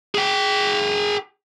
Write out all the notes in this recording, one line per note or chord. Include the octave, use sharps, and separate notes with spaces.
G#4 G5